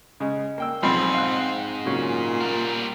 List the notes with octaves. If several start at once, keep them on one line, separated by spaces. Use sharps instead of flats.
C#3 G#3
A#3 G5 E6
B1 G#2 F3 C4 B5
F5 F#6
A#2 C#3 F#3 C#4
G3 A#4